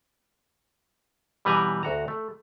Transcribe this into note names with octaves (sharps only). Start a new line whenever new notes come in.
B2 E3 G3 B4 G#5 A#5
D2 F#4 A#5
A3